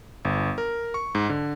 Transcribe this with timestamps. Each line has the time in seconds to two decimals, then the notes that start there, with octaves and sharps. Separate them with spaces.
0.25 G1
0.58 A#4
0.94 C#6
1.15 G#2
1.30 D3